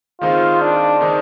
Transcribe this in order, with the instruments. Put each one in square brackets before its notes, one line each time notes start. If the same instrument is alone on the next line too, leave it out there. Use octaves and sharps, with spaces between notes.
[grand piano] D#3 G#3 C4 D#4 [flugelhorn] F4
[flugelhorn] D4
[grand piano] D#3 G#3 C4 D#4